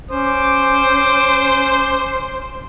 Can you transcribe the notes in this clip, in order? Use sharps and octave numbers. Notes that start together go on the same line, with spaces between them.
C#4 C5 D6